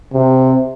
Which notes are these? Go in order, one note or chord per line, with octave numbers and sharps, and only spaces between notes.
C3